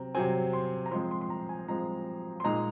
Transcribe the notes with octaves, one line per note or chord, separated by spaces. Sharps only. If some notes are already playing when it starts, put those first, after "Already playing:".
Already playing: C3 F#3 C4 A#5
C3 F#3 C4 G#5
C6
A#5
F3 G#3 C4 C6
C6
C6
A#5
G#5
F3 G#3 C4 A#5
C6
A#2 G#3 D#4 A#5